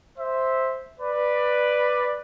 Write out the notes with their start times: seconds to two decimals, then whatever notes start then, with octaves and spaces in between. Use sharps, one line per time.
0.19 C5 E5
1.00 B4 D5